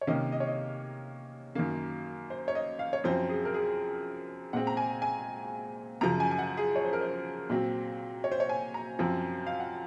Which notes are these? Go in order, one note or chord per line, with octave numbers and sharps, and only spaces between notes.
C#5
C3 D#3 A#3 C#4 D#5
D#5
C#5
D#5
F#2 D#3 A#3
C5
C#5
D#5
F5
C#5
F#2 F3 C4 C5
G#4
A#4
G#4
A#2 G#3 C4 F#5
A#5
G#5
G#5
F#2 C#3 F3 A#5
G#5
G#5
F#5
G#4
C#5
C5
A#4
C5
A#2 F#3 C4
C#5
C5
C#5
G#5
A#5
F#2 F3 C4
F5
F#5